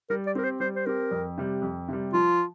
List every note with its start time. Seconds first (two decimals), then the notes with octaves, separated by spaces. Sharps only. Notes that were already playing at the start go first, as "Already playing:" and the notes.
0.10 G3 A#4
0.27 D5
0.35 C4 G4 A#4
0.44 C5
0.60 G3 C5
0.76 C5
0.86 C4 G4 A#4
1.11 F2
1.38 C3 G3
1.62 F2
1.88 C3 G3
2.13 F3 F4